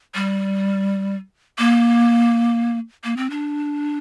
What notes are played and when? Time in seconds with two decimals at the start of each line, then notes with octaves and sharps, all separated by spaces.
0.15 G3
1.59 A#3
3.04 A#3
3.17 C4
3.30 D4